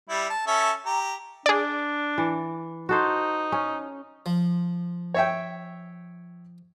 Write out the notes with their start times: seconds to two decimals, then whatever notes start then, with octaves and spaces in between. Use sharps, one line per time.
0.09 G3 E4
0.30 A5
0.47 C#4 A4 E5
0.86 G4 A#5
1.46 D4 G#4 D5
2.18 E3
2.89 D#4 F#4 A4 C5
3.52 C#4
4.26 F3
5.14 C#5 E5 G5